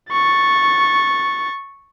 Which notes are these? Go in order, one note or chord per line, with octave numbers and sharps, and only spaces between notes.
C#6 A6